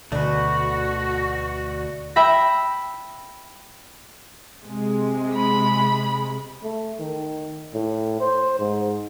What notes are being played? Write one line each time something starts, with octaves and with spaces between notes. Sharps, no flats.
D2 B2 D3 A3 F#4 B4 D5 D#5
E5 G5 B5 A#6
C3 G#3
B5
A3
D#3
A2
C5
G#2